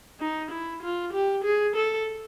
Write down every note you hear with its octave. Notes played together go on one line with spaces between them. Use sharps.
D#4
E4
F4
G4
G#4
A4